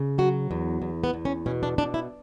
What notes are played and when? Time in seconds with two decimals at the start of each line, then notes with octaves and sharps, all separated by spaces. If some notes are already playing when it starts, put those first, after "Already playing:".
Already playing: C#3
0.18 F#3 F#4
0.51 E2
0.82 E2
1.04 B3
1.14 E2
1.25 C#4
1.46 B2 C#4
1.63 D4
1.78 B2 D4
1.94 E4